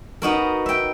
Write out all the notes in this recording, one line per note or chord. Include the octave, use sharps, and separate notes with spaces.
B3 D#4 F#4 A#4
E5 G5